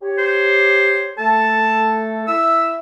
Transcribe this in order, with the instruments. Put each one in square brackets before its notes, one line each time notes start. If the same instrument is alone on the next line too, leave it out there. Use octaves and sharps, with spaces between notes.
[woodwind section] G4 C#5
[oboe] C5
[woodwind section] A3 A4 [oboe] A5
[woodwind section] E4 E5 [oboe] E6